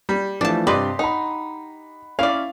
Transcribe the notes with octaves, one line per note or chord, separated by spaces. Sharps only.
G3
E3 F3 A3 D4 A5
G2 C3 G4 B4 D5 D#5 C6
D#4 F#5 B5
C#4 E4 D5 F5 F7